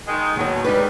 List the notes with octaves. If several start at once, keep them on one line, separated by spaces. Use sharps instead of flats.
D#3 G#3
D#2 B2 F#3 C#5
D#3 G3 G#3 D#4 B4